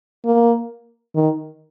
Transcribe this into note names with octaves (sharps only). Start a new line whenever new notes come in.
A#3
D#3